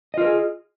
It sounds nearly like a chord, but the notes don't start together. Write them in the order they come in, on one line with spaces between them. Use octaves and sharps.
D#5 F4 A#4 G#4